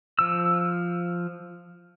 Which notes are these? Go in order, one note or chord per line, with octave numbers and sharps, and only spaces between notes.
F3 E6